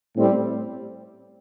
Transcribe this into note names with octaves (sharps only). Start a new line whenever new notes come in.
A2 G3 C4